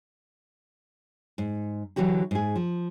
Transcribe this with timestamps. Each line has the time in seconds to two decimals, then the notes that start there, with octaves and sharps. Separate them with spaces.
1.38 G#2
1.96 D3 E3 F#3 F#4 G4
2.31 G#2 G#4
2.56 F3